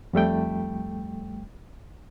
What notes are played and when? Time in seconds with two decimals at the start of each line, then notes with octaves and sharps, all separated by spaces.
0.13 F2 G3 A3 G5